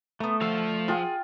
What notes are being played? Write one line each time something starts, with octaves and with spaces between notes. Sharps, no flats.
A3 B3 A#5
D3 F3 A4 F5 E6
F4 G#4 F#5 G5